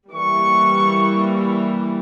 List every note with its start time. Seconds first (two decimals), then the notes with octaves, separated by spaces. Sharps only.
0.12 E3 G3 A#3 C#6